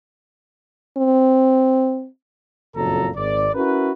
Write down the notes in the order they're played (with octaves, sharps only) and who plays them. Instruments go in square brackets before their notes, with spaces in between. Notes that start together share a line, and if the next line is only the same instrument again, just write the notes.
[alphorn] C4
[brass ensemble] F#1 F2 A#2 F#3 A4 A#5
G#1 D5
C#4 E4 F#4 A#4 B4